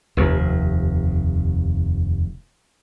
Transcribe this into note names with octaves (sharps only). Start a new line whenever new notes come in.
F1 D#2